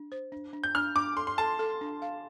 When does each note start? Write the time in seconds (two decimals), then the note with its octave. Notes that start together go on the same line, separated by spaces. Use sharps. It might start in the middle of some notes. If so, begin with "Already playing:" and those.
Already playing: D4
0.12 C5
0.32 D4
0.53 D4
0.64 G6
0.75 D4 F6
0.96 D4 D6
1.16 A4 C6
1.27 C6
1.38 A4 A5
1.59 A4
1.81 D4
2.02 F5